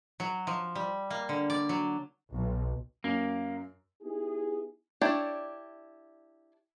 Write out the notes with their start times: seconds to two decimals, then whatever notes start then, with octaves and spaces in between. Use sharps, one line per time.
0.20 F#3
0.47 F3
0.76 G3
1.10 A#3
1.29 D3
1.50 D5
1.69 F#3
2.33 B1
3.04 F#2 A#3
4.03 B3 D#4 E4 G4 G#4
5.01 D4 E4 G4 C#5 D5